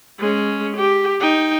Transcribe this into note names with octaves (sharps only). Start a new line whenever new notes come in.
G#3 C#4
G4
D#4 G5